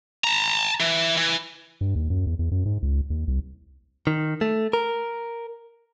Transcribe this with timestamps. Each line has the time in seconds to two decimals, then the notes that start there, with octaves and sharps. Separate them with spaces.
0.24 A5 A#5
0.81 E3
1.17 E3
1.81 G2
1.95 D#2
2.10 F#2
2.27 E2
2.39 E2
2.51 F#2
2.65 G#2
2.82 C#2
3.10 D#2
3.27 C2
4.07 D#3
4.41 A3
4.73 A#4